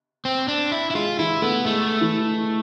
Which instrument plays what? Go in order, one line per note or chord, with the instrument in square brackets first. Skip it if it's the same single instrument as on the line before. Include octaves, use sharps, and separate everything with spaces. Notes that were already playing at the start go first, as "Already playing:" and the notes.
[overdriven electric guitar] C4
D4
E4
E4
[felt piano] G#3 [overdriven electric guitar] F4
[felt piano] E3 [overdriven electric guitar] E4
[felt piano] A3 [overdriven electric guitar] B3
[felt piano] G#3 [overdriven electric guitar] A3
[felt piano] E3